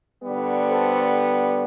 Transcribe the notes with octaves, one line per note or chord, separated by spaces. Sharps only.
D3 G3 B3
A4 C5